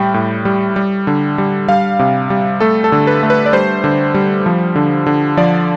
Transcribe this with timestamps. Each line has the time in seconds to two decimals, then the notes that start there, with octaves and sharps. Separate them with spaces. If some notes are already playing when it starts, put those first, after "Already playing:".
Already playing: A2 G3 G5
0.14 A2
0.45 G3
0.76 G3
1.07 D3
1.38 G3
1.68 G3 F5
1.99 C3
2.30 G3
2.60 A3 A4
2.84 A4
2.92 D3
3.07 B4
3.23 A3
3.30 B4
3.46 D5
3.53 G3 C5
3.84 D3
4.14 G3
4.46 F3
4.76 D3
5.06 D3
5.37 F3 D5